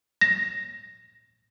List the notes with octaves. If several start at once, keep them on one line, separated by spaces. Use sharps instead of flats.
A#6